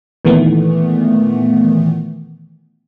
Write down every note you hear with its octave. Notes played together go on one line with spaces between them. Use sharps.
A#2 D#3 E3 A3 B3